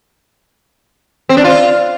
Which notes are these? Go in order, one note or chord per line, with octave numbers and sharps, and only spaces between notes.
C4
D4
F4